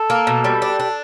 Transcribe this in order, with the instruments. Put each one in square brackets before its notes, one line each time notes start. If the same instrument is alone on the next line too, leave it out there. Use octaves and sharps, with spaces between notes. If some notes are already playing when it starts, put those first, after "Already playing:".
Already playing: [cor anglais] A4
[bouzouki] A#3
B2
G3
D4
D4